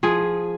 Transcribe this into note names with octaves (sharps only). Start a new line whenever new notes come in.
F3 G#4